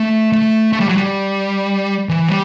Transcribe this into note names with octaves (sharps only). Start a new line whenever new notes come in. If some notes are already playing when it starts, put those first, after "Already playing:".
Already playing: A3
A3
A3
G3
F#3
G3
E3
G3